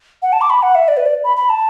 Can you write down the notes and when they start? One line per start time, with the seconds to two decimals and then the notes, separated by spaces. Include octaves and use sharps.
0.22 F#5
0.33 A5
0.41 D6
0.50 B5
0.63 F#5
0.75 E5
0.88 D5
0.97 B4
1.06 D5
1.24 B5
1.37 B5
1.49 A5